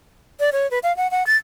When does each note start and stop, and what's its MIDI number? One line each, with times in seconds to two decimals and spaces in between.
0.40 0.50 74
0.53 0.69 73
0.71 0.79 71
0.83 0.95 77
0.97 1.10 78
1.11 1.26 78
1.26 1.36 93